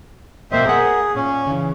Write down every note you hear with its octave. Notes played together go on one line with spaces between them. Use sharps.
B2 A#3 C4 C5 D#5 E5
G#4 A#4 F#5
A#2 C#4
C#3 E3